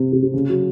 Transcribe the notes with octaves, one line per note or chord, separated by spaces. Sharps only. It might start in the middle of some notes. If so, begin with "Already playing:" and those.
Already playing: C3
C3
C3
C#3
F#3